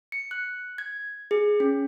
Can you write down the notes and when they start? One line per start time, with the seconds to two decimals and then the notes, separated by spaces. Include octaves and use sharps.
0.12 C#7
0.31 F#6
0.78 G#6
1.31 G#4
1.60 C#4